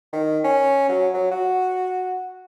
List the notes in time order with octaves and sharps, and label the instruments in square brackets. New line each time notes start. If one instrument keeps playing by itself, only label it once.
[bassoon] D#3
C#4
F#3
F#3
F#4